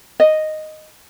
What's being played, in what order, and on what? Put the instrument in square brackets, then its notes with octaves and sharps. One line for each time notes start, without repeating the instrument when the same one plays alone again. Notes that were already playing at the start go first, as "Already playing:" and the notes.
[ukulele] D#5